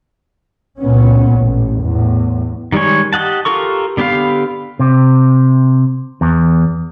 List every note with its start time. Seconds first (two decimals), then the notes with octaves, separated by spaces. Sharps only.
0.79 C#2 A#2 B3 C#4
1.35 A1
1.80 E2 A2
2.72 D#3 G3 G#3 C#4 C#5
3.13 G4 D#5 F#5 A5
3.45 F4 G4 A4 A#4 C#6
3.97 D3 B3 G4 B4 F5
4.79 C3
6.21 E2